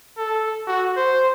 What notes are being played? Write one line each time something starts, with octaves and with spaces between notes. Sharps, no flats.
A4
F#4
C5